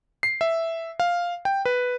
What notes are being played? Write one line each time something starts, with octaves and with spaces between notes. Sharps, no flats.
C7
E5
F5
G5
B4